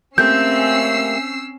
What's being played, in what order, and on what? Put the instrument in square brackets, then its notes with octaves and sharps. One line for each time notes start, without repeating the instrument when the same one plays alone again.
[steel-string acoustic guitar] A3 A#3 G4 [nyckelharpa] C4 [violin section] C#4 E6 C7 [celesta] G6